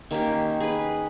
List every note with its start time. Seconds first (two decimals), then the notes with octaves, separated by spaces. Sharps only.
0.11 D#3 A#3 C#4 G4
0.61 G#4 B4